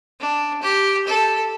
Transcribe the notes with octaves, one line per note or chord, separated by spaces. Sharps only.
D4
G4
A4